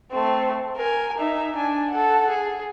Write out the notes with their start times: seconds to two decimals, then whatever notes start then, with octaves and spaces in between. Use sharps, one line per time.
0.11 A3 C4
0.76 A#4 G#5
1.18 D#4 E5
1.55 D4 G#5
1.91 A4 F#5
2.29 G#4